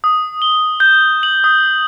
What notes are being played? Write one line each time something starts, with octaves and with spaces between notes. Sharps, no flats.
D#6
G7
G6
F#7
D#6